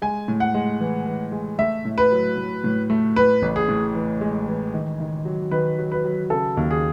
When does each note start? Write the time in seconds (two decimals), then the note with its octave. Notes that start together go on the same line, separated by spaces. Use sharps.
0.02 G#3 G#5
0.28 A2
0.40 F#5
0.54 G#3
0.80 E3
1.06 E3
1.32 G#3
1.59 A3 E5
1.85 A2
1.98 B4
2.11 F#3
2.37 A2
2.64 A2
2.90 A3
3.16 A2 B4
3.42 A1
3.56 G#4
3.69 A2
3.95 E3
4.21 G#3
4.47 E3
4.74 D#3
5.00 D#3
5.25 F#3
5.51 D#3 B4
5.78 F#3
5.92 B4
6.04 F#3
6.30 C#3 A4
6.57 D#2
6.71 G#4